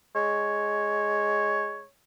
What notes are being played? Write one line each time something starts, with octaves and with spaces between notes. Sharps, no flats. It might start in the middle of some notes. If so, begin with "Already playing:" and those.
G#3 C#5